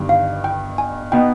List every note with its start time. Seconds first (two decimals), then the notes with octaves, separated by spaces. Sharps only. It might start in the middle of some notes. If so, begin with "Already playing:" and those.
Already playing: G1 G2 D#3 G3
0.09 F5
0.44 G5
0.78 G#5
1.12 B2 B3 D#4 G5